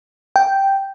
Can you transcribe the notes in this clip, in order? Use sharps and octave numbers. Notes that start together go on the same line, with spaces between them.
G5